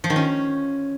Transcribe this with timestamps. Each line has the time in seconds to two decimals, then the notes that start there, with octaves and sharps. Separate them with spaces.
0.04 F3
0.10 D#3
0.16 C#4